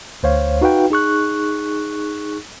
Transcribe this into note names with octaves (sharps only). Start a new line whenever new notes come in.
D2 C5 C#5 F5
D#4 F#4 B4 F5 G5
D#4 G#4 C#6 F#6